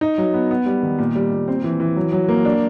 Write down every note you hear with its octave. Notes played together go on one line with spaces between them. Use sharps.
D#4
F#3
B3
B3
G3
D#3
A#2
G3
A#2
C4
E3
E3
F#3
F#3
A#3
D4